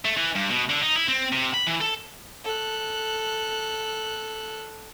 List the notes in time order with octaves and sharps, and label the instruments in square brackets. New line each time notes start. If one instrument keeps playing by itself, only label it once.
[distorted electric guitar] A3
E3
G2
B2
D3
D#4
E4
C4
C3
B5
E3
A4
[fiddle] A4 F#6